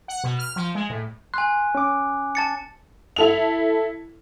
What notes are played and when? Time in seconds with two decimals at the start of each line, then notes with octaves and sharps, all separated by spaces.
0.08 F#5
0.24 B2
0.39 F6
0.56 F3
0.75 G#3
0.90 A2
1.34 G#5 C6 F#6
1.75 C#4 D6
2.35 A5 A6 C#7
3.16 E4 A4 F7